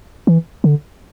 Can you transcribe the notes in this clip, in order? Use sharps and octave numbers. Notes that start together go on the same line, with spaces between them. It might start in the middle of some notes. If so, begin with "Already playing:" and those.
E3
D3